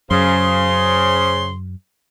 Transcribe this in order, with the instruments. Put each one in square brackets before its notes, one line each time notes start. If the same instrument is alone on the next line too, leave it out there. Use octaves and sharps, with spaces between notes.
[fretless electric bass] F#2 [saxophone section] C#3 [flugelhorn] C5 [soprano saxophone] C6